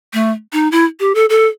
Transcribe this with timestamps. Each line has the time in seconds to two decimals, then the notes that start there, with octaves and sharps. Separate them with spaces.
0.13 A3
0.53 D#4
0.72 E4
1.00 G4
1.15 A4
1.30 A4